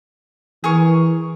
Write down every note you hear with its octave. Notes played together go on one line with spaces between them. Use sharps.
E3 G#4 A#4 C#6